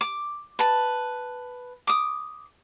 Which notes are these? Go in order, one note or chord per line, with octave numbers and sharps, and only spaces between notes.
D6
B4 A5
D6 D#6